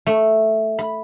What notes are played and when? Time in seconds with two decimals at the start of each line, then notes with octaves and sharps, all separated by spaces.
0.07 A3
0.79 B5